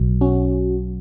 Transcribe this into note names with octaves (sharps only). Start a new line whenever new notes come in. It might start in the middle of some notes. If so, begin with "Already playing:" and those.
Already playing: B1 B2 F#3
C#4 F#4